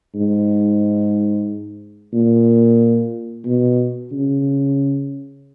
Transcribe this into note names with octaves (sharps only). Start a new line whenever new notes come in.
G#2
A#2
B2
C#3